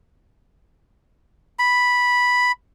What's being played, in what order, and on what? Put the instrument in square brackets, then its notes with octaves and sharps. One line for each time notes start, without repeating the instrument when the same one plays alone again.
[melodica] B5